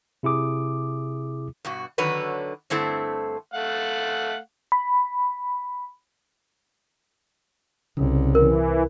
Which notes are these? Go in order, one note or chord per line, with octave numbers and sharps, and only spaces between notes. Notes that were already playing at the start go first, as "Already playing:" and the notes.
C3 E4 G#4 D6 D#6
G2 B2 F#4
D3 D#3 F#3 B4 C#5
G2 D3 A3 C4 E4 A4
A3 F5 F#5
B5
C2 C#3
E3 A#4